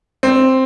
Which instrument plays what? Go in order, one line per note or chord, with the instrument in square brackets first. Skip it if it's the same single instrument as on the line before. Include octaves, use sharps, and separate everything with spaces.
[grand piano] C4